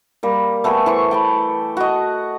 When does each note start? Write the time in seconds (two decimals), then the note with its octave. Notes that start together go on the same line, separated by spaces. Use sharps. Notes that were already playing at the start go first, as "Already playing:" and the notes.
0.23 G3 A#3
0.64 A3 B3 A4 G#5
0.86 E3 C5 C#6
1.11 G5 A5 B5
1.77 F#4 D#5